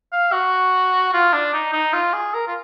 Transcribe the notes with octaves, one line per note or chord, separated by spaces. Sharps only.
F5
F#4
F4
D4
D#4
D#4
F4
G#4
A#4
F4